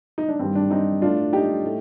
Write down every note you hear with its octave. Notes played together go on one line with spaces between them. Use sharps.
D#4
D4
G2 D#3 G3 C4
D4
C4 D#4
A2 A3 D4 F4
D#4 G4
A2 A3